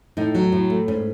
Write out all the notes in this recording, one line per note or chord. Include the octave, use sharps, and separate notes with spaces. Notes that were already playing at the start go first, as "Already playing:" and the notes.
A2 D#4
F#3
A2
A3
G#2 C#4